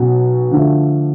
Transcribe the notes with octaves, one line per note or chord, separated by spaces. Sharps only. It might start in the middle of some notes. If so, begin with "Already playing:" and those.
Already playing: B1 B2 F#3 C#4
D3 F3 A3